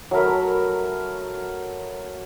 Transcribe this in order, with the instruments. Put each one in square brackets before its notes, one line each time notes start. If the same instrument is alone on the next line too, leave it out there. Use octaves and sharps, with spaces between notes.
[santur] F#3 A3 A#4 B5